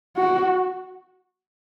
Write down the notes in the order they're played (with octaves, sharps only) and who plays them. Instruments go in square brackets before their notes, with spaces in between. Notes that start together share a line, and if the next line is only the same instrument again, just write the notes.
[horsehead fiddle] F#4